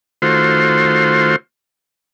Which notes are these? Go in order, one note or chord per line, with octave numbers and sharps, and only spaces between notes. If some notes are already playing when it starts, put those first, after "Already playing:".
D#3 A3 F4 F#4 C5 C6